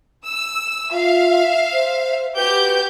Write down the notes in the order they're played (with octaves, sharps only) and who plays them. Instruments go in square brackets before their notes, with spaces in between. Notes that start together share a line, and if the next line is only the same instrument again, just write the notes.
[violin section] E6
[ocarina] F4 [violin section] E5 F5
[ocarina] C5
[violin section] F#4 G4 G6 [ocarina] B4